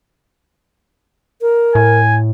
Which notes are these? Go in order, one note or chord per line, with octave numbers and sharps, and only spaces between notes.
A#4
A2 G#5